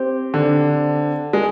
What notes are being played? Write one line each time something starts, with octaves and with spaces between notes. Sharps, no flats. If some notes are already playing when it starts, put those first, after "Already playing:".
Already playing: C4 G4 C5
D3
G#3